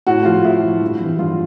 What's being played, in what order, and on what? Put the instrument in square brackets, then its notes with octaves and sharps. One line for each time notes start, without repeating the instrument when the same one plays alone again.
[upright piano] A2 F#4
F3 F4
A2 E4
F3
G2
E3 G3
G2 F4